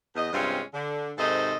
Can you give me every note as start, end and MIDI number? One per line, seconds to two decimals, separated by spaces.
0.16 0.31 40
0.16 0.31 75
0.33 0.61 43
0.33 0.61 48
0.33 0.61 56
0.33 0.61 60
0.33 0.61 61
0.33 0.61 65
0.74 1.11 50
1.17 1.56 44
1.17 1.56 48
1.17 1.56 51
1.17 1.56 69
1.17 1.56 72
1.17 1.56 75